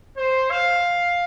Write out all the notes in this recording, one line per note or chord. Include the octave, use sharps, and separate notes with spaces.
C5
F5